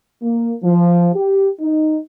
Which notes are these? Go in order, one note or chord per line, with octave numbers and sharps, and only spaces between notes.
A#3
F3
G4
D#4